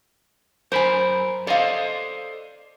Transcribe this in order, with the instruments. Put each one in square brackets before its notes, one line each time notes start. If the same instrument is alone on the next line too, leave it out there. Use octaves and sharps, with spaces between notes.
[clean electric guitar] F#2 A#4 B5 [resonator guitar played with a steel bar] C5 G#5
[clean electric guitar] A4 C5 D#5 [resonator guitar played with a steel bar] D5 F5